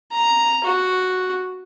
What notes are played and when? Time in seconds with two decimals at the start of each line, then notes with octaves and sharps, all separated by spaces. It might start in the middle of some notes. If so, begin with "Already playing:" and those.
0.12 A#5
0.64 F#4